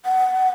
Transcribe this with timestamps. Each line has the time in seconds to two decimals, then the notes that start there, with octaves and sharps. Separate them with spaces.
0.05 F#5